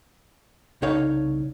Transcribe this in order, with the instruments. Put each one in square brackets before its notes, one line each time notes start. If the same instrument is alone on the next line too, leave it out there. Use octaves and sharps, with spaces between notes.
[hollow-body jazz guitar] C2 C#3 D#4 A4 C#5 F5